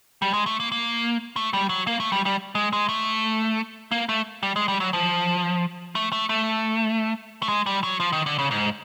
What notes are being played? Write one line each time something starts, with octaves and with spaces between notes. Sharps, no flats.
G3
G#3
A3
A#3
A#3
A3
G3
F#3
A#3
A3
G3
G3
G#3
G#3
A3
A#3
A3
G3
G#3
G3
F#3
F3
A3
A3
A3
A3
G#3
G3
F#3
F3
D#3
D3
C#3
G#2